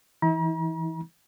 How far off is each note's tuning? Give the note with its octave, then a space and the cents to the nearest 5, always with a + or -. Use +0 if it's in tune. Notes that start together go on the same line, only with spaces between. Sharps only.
E3 +0 E4 -40 A#5 +45